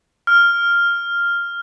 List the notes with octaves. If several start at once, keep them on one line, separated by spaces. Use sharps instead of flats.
F6